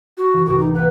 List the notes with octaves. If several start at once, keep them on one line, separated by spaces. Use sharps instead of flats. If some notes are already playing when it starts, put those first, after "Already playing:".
F#4
E3
C2 A2 F#4 D6
D#4
A#3 G4 B4 F#5